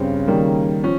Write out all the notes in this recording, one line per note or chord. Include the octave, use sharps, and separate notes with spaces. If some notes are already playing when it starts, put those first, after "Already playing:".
Already playing: G2 C#3 C4
D#3 G3 A#3
F3 C#4